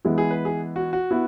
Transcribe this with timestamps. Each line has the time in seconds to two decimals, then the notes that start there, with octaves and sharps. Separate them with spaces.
0.05 E3 G#3 B3 E4
0.18 G#4
0.31 B4
0.45 G#4
0.76 F#4
0.93 F#4
1.11 B3 E4